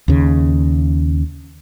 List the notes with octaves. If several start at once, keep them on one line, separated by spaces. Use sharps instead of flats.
D#2 C#3